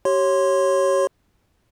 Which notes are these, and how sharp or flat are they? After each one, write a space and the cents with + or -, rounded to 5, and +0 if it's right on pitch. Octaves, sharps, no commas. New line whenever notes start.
G4 -30 C#5 -15 C6 +0